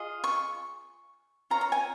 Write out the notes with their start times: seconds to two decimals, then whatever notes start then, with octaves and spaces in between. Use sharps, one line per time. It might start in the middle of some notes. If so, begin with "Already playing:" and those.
Already playing: F4 G#4 D#5
0.24 C#6
1.50 F4 C#5 A#5
1.61 A#5
1.72 G#5